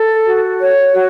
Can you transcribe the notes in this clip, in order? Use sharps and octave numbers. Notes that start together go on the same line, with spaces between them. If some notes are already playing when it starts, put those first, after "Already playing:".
Already playing: A4
F#4
C#5
F#4